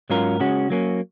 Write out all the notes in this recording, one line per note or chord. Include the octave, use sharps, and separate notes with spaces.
G#2 F#3 C#4 F4 A#4
C#3 G#3 C#4 F#4
F#3 A#3 C#4